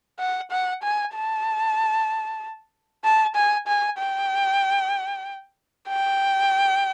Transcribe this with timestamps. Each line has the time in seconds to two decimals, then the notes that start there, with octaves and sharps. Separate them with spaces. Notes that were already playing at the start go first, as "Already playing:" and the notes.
0.19 F#5
0.51 F#5
0.83 G#5
1.14 A5
3.04 A5
3.35 G#5
3.68 G#5
3.98 G5
5.88 G5